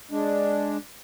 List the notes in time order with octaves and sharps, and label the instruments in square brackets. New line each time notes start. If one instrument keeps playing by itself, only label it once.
[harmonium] G#3 D4